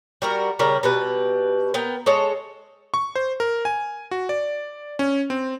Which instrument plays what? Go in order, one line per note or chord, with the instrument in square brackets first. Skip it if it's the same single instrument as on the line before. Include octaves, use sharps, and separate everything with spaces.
[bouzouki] G3 F#4 A#4
C#3 G3 A#4
B2 G3 B4
B3 A#4 G5
G#3 A4 C#5 D#5
[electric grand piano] C#6
C5
A#4
G#5
F#4
D5
C#4
C4